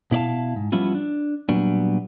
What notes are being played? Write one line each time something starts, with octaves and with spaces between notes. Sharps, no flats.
B2 E4 A#4 D5 F5 A5
G#2
F3 G3 B3 C#4 E4 F4
D4
A#2 F#3 G3 B3 D4